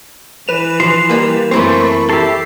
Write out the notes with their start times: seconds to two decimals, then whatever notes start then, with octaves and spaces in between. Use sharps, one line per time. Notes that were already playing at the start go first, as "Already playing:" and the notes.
0.48 E3 B4 E7 F7
0.80 F3 C6
1.09 G3 A#3
1.51 F#2 E3 A3 A#3 C4 C5 B5 C#6
2.09 G4 A4 E5 C7